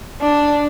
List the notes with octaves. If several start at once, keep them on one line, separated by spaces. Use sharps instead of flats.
D4